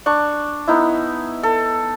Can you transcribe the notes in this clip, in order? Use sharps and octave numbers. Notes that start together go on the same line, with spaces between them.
D4 C#6
B3 D#4 E4
A4